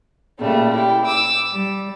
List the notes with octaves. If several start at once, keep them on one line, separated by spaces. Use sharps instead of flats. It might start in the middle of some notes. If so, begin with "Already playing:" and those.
A#2 C#3 G3 A3
E4 G4
D6 E6
G3